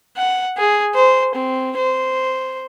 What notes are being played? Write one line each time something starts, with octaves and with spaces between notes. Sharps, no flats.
F#5
G#4
C5
C4
C5